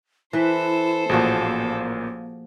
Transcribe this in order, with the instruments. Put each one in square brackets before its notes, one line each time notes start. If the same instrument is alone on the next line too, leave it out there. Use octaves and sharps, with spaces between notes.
[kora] E3 B4 [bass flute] E4 [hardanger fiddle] A4 C5
[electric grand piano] A1 A#2 [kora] F3 F#4 G#4 [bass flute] A#3